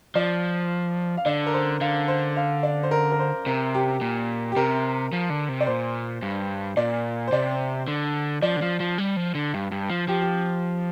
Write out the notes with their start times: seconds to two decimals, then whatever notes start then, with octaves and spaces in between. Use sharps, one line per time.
0.15 F3 D5
1.17 F5
1.26 D3 D5
1.46 A#4
1.54 C5
1.81 D3 F5
2.08 C5
2.37 F5
2.63 D5
2.83 C5
2.91 A#4
3.12 A#4
3.19 C5
3.46 C3 A#4
3.74 G4
4.01 A#2
4.52 G4
4.56 C3 A#4
5.13 F3
5.30 D3
5.49 C3
5.61 D5
5.67 A#2 C5
6.22 G2
6.77 A#2 D5
7.28 C5
7.32 C3 D5
7.88 D3
8.42 F3 D5
8.56 D3
8.62 F3
8.80 F3
8.98 G3
9.17 F3
9.35 D3
9.54 G2
9.72 G2
9.90 F3
10.08 F3 G4
10.22 G4